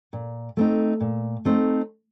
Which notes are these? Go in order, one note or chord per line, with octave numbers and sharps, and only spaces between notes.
A#2
A3 C4 D#4
A#2
A3 C4 D#4